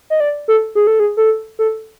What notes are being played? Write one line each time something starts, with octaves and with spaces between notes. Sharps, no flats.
D#5
D5
A4
G#4
A4
G#4
A4
A4